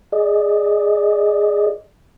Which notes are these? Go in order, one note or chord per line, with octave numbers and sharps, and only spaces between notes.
G#4 D5 D#5